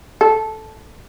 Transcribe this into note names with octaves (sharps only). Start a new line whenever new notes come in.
A4